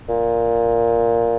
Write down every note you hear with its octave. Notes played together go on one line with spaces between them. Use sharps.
A#2